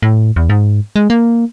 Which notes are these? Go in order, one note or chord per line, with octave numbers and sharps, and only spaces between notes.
A2
E2
G#2
G#3
A#3